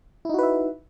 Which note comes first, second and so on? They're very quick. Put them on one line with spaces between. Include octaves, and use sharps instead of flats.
E4 D#4 F#4 B4 E5